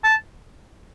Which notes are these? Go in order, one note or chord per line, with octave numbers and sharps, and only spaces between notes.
A5